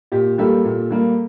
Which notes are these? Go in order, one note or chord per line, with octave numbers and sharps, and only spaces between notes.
A#2 G4
G3 A#3 G4 A4
A#2
G3 A#3